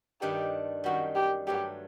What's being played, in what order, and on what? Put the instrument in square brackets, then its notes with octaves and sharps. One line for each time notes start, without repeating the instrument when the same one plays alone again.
[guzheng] G2 D#3 A3 D4 [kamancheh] G4
[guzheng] F#2 D#3 G3 [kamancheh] F#4
[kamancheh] G4
[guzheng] G2 F#3 A3 [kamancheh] G4